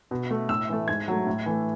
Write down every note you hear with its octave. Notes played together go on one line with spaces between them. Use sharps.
B2
A3
A2 E6
E3 A3
G#2 G#6
F#3 A3
A2
E3 A3